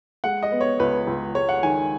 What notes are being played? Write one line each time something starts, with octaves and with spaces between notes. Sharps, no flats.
G#3 F#5
D#5
B3
C#5
C#2 B4
C#2
G#3 C#5
F#5
D#3 G#5